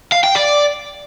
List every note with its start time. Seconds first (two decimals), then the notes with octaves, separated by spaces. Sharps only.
0.12 F5
0.24 G5
0.36 D5